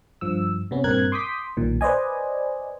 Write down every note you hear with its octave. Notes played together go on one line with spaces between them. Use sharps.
G2 F3 E6
C3 B3 C#4
G2 A#2 C4 A#4 F#6 G#6
C6 D6 D#6 G6 B6
B1 A#2 D#3
B4 C5 D5 D#5 G#5